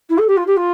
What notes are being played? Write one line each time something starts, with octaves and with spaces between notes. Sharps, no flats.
E4
A4
G4
F4
G4
F4